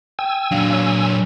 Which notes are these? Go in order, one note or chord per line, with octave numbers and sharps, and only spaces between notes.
G5 G#5 E6
A#2 F#3 D4 F5
C#5